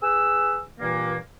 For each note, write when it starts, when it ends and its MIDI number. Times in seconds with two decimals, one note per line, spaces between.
0.02 0.61 68
0.02 0.61 71
0.02 0.61 88
0.80 1.16 43
0.80 1.16 46
0.80 1.16 52
0.80 1.16 58